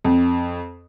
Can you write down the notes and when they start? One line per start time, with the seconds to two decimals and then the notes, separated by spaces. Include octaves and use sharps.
0.04 F2